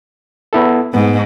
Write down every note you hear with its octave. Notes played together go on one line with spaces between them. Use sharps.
B3 E4 A4
G#2 B3